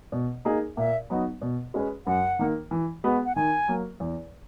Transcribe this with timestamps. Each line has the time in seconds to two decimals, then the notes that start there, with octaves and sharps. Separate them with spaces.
0.12 B2
0.45 A#3 D#4 G#4
0.77 A#2 E5
1.10 F#3 B3 D#4 F#4
1.42 B2
1.74 G#3 C#4 G#4 B4
2.07 F#2 F#5
2.39 D#3 A#3
2.71 E3
3.04 G#3 B3 F#4 B4
3.25 F#5
3.36 D#3 G#5
3.68 F#3 A#3
4.00 E2